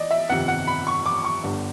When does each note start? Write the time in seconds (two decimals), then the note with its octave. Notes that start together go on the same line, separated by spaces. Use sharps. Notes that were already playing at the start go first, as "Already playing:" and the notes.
Already playing: E3 D5 D#5
0.11 E5
0.29 G1 F2 C3 D#3 F#5
0.48 F#5
0.67 B5
0.87 C#6
1.06 D6
1.24 C#6
1.43 G1 G2 D3